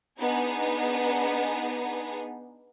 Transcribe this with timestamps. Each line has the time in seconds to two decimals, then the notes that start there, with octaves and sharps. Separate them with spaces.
0.20 B3 D4 D#4 G#4